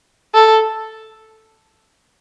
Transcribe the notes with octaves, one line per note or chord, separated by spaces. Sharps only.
A4